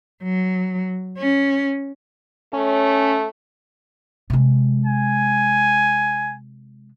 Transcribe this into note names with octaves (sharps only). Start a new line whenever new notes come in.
F#3
C#4
A3 C#4
C3 G#3
G#5